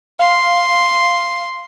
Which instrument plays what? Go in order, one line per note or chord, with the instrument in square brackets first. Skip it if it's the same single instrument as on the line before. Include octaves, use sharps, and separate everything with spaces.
[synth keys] F5 [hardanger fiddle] C6